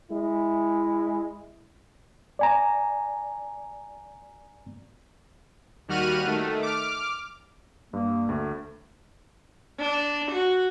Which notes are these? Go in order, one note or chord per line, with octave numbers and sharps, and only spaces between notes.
G#3 E4
D5 G#5 A#5
D#2 G3 F#4 F6 F#6 D#7
D#3 A3
D6 F6
G2 A#3
D2 A3
D4
F#4